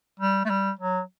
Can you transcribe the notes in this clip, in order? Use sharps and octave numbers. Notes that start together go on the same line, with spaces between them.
G3
A3
G3
F#3